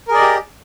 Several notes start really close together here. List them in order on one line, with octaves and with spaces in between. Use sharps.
A#4 G#4 D5 D#5 G4